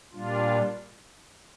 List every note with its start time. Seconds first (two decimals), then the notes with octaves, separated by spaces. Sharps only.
0.12 A#2 G3 D4 F4